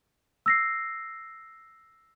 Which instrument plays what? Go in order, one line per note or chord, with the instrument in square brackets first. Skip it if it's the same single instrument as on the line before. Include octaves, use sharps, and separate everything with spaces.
[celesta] E6 A#6 C7